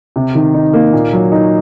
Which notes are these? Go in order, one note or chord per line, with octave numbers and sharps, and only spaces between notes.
C3
D#3
D#4
A#3
A#2
F#3
D#4